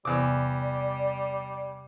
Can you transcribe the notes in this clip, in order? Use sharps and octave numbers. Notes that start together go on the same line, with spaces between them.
E2 C3 G3 D5 D6